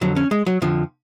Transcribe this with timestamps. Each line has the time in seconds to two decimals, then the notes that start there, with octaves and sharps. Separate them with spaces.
0.01 F2 D3 F#3
0.16 C#4
0.31 G#3
0.46 F#3
0.62 F2 D3 F3